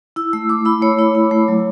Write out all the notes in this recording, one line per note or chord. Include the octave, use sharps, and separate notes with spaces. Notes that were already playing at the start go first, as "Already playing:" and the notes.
E4 E6
A3 E6
A3 D6
E4 B5
A3 C#5
E4
E4
A3
F#3